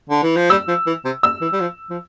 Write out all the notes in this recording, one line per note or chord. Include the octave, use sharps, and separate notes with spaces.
D3
E3
F3
G3 E6
F3
E3
C3
E6
E3
G3
F3
F3